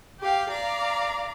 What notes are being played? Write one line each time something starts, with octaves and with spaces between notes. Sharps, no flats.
G4 F5 G5
D5 F5 A#5